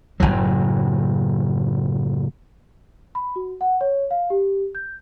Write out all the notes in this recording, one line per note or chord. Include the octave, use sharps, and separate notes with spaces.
F#1 B1 A2 F#3
B5
F#4
F#5
C#5
F5
G4
G6